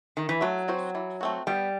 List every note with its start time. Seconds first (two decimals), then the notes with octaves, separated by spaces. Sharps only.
0.17 D#3
0.29 E3
0.41 F#3 A3
0.68 C4 F#4 C5
0.95 E3
1.21 A3 C4 F#4
1.47 G3 B3